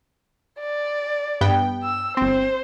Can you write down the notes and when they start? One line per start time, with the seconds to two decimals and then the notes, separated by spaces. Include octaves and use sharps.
0.59 D5
1.41 G2 B3 G5
1.84 E6
2.17 G1 C4 C5